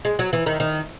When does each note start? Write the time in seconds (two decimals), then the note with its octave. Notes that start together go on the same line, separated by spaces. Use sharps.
0.05 G#3
0.19 F#3
0.33 E3
0.46 D#3
0.60 D#3